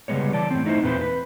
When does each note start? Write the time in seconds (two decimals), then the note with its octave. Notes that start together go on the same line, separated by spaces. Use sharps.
0.08 C#3 G3 G#3 B3 C#5
0.32 E3 D5 A5
0.51 A2 C4
0.65 A3 D#4 E4 A#4 C5
0.83 E2 A#2 C4 B4 C5
1.01 B4